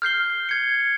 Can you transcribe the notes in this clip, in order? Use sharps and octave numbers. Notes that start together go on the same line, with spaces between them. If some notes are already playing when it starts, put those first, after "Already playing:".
F6 G6 C7 G7
G#6 C#7